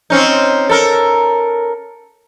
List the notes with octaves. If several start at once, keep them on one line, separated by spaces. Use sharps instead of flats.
C4 C#4 D#4
A4 A#4